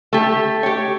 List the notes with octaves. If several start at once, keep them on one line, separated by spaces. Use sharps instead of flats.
A3 G4
G4 C#5